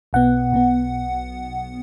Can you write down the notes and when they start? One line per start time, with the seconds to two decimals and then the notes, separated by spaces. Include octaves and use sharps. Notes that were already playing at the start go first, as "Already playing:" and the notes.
0.13 B1 B2 B3 F#5
0.52 B1 B2 B3